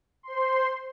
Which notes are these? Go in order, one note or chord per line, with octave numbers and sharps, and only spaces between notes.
C5 C6